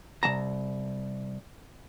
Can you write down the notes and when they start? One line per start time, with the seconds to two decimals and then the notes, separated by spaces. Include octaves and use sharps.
0.23 C2 F3 A5 A#5